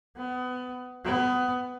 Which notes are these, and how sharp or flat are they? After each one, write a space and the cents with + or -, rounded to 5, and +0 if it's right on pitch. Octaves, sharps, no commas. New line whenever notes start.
B3 +25
B3 +20